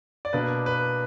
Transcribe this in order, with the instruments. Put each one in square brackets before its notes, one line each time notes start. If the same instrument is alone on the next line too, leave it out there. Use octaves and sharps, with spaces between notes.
[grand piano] D5
B2 A#3 D4 B4
B4